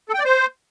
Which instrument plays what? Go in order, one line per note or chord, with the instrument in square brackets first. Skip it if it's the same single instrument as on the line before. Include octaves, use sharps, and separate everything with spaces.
[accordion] A4
G5
D5
C5